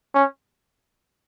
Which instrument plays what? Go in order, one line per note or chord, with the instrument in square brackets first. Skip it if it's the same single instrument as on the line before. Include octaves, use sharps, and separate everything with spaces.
[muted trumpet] C#4